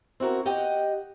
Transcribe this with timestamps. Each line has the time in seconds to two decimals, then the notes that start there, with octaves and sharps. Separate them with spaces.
0.20 C4 E4 F#4 A#4
0.46 G4 D#5 F#5 G5